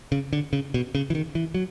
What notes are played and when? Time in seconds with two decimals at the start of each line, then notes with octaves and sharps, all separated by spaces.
0.12 C#3
0.33 D3
0.53 C#3
0.74 B2
0.95 C#3
1.10 E3
1.15 D#3
1.35 E3
1.55 F#3